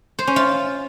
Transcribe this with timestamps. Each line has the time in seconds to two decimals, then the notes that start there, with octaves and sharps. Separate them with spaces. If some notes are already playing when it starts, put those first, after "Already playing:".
0.19 C5
0.27 C#4
0.36 F4